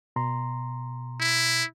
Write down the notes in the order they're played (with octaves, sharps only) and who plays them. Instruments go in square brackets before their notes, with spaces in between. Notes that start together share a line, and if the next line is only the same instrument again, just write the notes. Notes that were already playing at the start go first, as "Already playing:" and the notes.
[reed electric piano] B2 A#5 C6
[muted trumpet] E4